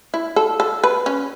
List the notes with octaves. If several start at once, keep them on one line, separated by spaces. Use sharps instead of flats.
E4
A4
A4
B4
C#4